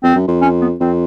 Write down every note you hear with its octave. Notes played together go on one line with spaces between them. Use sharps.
F2 C4
F#2
F2
C#4
B3
F2 C4